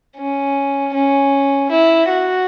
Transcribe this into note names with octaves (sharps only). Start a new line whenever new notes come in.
C#4
C#4
E4
F#4